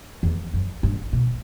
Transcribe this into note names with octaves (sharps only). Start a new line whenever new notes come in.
E2
F#2
G2
B2